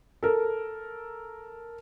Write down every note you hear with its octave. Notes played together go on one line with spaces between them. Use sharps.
A4 A#4